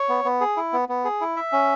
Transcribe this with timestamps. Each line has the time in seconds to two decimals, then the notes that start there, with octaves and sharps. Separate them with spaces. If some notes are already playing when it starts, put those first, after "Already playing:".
Already playing: C#5
0.09 B3
0.25 B3
0.41 G#4
0.57 E4
0.73 B3
0.89 B3
1.05 G#4
1.21 E4
1.36 E5
1.52 C#4